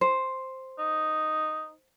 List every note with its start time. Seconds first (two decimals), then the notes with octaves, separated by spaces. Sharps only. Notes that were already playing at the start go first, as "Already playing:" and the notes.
0.01 C5
0.78 D#4